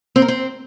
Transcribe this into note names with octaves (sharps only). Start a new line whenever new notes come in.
C4
A#4
C4